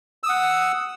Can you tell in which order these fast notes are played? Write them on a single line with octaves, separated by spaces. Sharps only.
E6 D#6 F#5